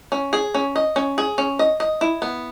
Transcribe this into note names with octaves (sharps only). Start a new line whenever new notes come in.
C#4
G#4
C#4
D#5
C#4
G#4
C#4
D#5
D#5
E4
B3